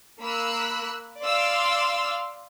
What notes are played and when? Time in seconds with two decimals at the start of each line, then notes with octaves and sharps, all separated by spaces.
0.20 A#3 B5 E6 F#6
1.22 D5 F5 C6 E6